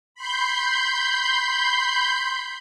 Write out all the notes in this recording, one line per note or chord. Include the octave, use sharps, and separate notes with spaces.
B5 C6 G6